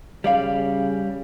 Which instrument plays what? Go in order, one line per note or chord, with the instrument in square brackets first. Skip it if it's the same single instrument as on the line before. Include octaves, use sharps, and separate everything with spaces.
[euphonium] C#3 [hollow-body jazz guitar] G3 D5 F5